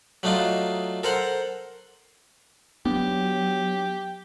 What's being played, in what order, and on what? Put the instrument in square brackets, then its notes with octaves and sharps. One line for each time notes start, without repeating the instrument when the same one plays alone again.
[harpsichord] F#3 A3 D4 D#4 F4
A4 A#4 C5 F#5
[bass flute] F#3 [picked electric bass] B3 D4 [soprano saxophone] G4